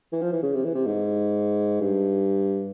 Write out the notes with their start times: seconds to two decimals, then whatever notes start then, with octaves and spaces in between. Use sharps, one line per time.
0.12 E3
0.22 F3
0.33 E3
0.43 C#3
0.54 C3
0.64 E3
0.74 C3
0.86 G#2
1.81 G2